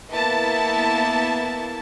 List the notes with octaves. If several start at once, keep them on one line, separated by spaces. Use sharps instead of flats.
A#3 B3 E4 A5